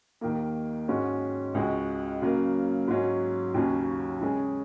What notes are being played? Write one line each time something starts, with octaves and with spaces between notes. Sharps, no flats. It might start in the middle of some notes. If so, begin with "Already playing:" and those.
D#2 D#3 A#3
G#2 G#3 C#4 F#4
C#2 C#3 G#3 F#4
C#3 F#3 A#3
G#2 F#3 C#4
D#2 C#3 F#3 C#4
C#3 G#3 C#4 G#4